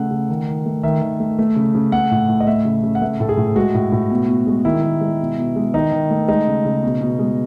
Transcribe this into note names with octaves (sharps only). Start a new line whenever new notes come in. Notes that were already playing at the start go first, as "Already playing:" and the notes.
Already playing: C#3 A3 F#5
C#3
D#3
D#3
A3
D#3 E5
D#3
A3
A3
C#3
C#3
A3 F#5
A2
A2
D#5
A3 E5
C#3
C#3
F#5
A3 E5
A2 A4
G#4
A2
G#3 F#4
A2
A2
B2
B2
G#3
D#3 E4
D#3
G#3
B2
B2
G#3
D#3 D#4
D#3
A3
G#3 D#4
C#3
C#3
B2
B2
G#3